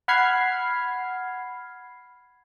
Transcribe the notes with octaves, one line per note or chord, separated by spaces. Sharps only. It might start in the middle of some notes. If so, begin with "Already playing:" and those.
F#5 B5 F6 G#6 C7